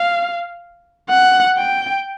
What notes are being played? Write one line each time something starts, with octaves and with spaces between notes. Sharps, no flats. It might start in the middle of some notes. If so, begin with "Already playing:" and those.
Already playing: F5
F#5
G5